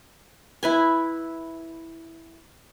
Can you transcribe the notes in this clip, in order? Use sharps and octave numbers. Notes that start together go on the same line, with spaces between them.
E4 B4 G#5